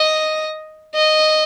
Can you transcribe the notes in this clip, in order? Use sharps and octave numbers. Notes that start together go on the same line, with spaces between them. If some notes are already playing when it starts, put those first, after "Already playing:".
Already playing: D#5
D#5